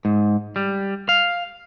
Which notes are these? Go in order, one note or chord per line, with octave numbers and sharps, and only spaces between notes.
G#2
G3
F5